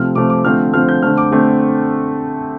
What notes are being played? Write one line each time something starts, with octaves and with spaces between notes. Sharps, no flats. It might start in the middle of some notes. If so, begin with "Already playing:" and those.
Already playing: C3 F3 A3 C4 F6
C3 F3 A3 C4 D6
D6
D3 F3 A3 C4 F6
D3 F3 A3 C4 F6
G6
D3 A3 C4 F6
D6
D3 A3 C4